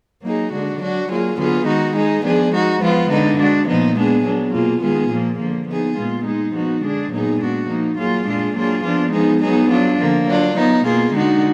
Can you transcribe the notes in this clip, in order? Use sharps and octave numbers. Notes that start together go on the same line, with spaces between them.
F#3 A#3 D#4 G#4
D3 G#3 D4 F#4
F#3 D4 F#4
F#3 A#3 F4 G#4
D3 F#3 B3 F4 G#4
D#3 G#3 D#4 F#4
G#3 D#4 G#4
F3 B3 D4 G#4
G#3 D#4 F#4
F3 G#3 B3 F4
D3 G#3 D#4
G#3 D4 F#4
A#2 F3 B3 D#4
G#3 B3 D4 G#4
F#3 B3 D4
B2 A#3 F4 G#4
D#3 G#3 B3 F4 G#4
A#2 F3 A#3
D3 F3 A#3
F3 B3 D#4 G#4
A#2 G#3 B3 F4
G#3 D#4 G#4
F3 B3 D#4 F#4
D3 G#3 D4 G#4
A#2 F#3 B3 D#4 G#4
G#3 D4 F#4
F3 A#3 D#4
F#3 A#3 F4 G#4
A#2 G#3 D4 F4 G#4
F#3 A#3 D4 F4 G#4
F3 B3 D4 F4
F3 G#3 B3 D#4 G#4
F#3 B3 D#4 G#4
F#3 D4 F4
D3 F3 A#3
F#3 D4 F4
F#3 B3 D#4
B2 A#3 F4 G#4
D3 G#3 D#4 F#4